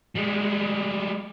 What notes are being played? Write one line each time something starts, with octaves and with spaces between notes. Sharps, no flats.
G3 G#3